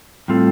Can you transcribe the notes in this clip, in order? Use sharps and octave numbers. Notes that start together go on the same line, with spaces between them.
A2 G3 C4 F4 A4